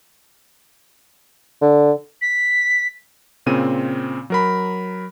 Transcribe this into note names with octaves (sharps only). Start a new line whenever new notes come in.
D3
B6
A#2 C#3 C4 D#7
F#3 A#4 B5